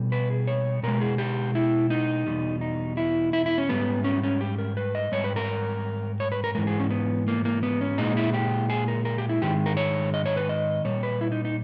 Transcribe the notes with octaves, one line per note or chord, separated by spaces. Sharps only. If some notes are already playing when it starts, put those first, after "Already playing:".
Already playing: B2 G3
B4
G#4
C#5
B2 G#3 A#4
G#4
G4
E4
D#4
E2 B2 G3
D#4
E4
E4
E4
C#4
G#2 G3 B3
C#4
C#4
G4
A#4
B4
D#5
G#2 G3 C#5
B4
A#4
C#5
B4
A#4
G#2 E3 G#3 A#4
G#4
C#4
B3
A#3
A#3
B3
C#4
A#2 G#3 D#4
E4
G4
G#4
A#4
A#4
G4
E4
G#2 D#3 G#3 G4
A#4
C#5
D#5
C#5
B4
D#5
A#2 G3 C#5
B4
E4
D#4
D#4